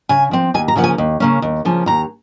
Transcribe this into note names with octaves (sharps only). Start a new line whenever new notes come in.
C#3 G#5
F3 C4
D#2 G#5
A#5
C#3 F3 A#3 C#4 F#5
G#5
D#2
C#3 F3 A#3 C#4
D#2
C#3 F3 A#3 C#4
D#2 A#5